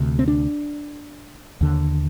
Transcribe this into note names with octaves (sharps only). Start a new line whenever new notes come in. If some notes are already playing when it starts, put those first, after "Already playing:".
Already playing: D2 C3
C4
D4
D#2 D3